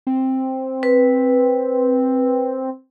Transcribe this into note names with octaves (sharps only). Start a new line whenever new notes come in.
C4
B4